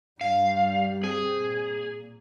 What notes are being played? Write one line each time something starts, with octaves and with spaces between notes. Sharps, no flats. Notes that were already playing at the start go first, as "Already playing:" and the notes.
G2 G3 F5
C4 G#4
A#2